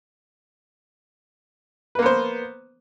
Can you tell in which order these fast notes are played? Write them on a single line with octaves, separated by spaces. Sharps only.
B4 A#3 B3 C5